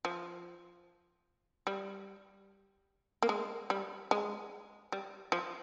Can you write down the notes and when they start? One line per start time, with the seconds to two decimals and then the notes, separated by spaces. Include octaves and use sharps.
0.05 F3
1.67 G3
3.23 A#3
3.29 G#3
3.70 G3
4.11 G#3
4.92 G3
5.32 F3